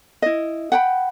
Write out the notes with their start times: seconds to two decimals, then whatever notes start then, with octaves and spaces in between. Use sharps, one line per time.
0.22 E4 D#5
0.72 F#5 G5 B5